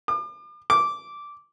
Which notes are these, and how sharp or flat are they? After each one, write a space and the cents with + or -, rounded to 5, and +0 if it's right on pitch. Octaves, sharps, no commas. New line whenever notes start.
D6 +40
D6 -10